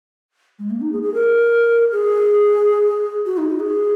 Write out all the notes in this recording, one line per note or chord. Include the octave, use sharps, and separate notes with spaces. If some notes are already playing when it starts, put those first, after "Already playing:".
G#3
A#3
D#4
G#4
G#4
A#4
G#4
F#4
D#4
D#4
G#4